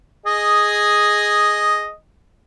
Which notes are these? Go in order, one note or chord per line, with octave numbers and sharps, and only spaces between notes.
G#4 D#5